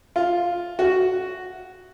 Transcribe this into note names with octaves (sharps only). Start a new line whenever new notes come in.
F4
F#4